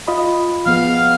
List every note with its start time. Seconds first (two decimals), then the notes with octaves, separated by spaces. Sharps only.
0.07 F4 D#5 B5
0.66 F3 B3 G#4 F5